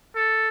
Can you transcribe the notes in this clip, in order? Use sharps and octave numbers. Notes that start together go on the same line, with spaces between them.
A4